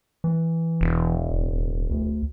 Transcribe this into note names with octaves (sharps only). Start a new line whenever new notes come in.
E3
E1
D1
D2